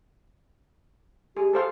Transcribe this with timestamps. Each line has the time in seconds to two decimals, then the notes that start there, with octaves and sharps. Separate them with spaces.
1.37 G4 G#4
1.53 A4 C5 F5